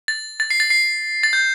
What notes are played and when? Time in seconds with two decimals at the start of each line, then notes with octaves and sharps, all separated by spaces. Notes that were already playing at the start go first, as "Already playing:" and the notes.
0.08 A6
0.40 A6
0.51 C7
0.60 A6
0.70 C7
1.23 A6
1.33 G6